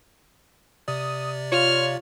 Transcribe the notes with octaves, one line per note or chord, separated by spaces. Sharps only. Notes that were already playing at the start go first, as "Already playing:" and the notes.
C3 D5 D#6
F4 C#5 F6